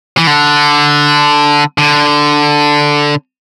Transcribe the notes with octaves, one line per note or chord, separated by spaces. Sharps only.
E3
D3
D3